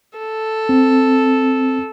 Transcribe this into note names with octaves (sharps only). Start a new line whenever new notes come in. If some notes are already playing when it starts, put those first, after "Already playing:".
A4
C4